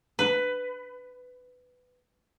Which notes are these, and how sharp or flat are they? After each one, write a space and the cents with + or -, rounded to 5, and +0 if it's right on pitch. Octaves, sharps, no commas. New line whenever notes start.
B4 +15